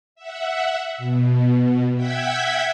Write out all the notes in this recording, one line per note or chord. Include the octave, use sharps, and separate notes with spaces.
E5 F#5
B2
E5 F#5 G5 G#6 B6